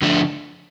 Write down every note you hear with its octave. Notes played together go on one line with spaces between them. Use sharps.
D3 F3 A3 D4